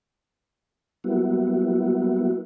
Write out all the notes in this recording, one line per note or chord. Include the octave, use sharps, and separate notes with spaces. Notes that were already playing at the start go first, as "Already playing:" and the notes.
F#3 G3 A#3 B3 E4 F#4